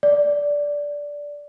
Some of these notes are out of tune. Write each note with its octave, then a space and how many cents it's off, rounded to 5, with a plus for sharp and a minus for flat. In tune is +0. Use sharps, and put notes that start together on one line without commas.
D5 -10